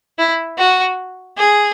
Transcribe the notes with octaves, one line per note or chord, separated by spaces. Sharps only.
E4
F#4
G#4